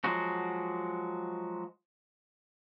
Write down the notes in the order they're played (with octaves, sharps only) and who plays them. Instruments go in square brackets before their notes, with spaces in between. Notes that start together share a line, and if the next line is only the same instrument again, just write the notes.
[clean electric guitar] F3 F#3 G#3 F#4